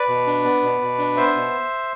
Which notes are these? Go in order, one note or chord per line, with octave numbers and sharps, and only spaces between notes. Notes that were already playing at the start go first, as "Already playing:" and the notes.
Already playing: B4 D5
B2
D4
B3
B2
B2
D4
B3 C5 E5
B2